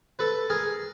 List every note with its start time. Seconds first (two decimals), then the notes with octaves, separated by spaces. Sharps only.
0.19 A4 B4
0.50 G#4 A#4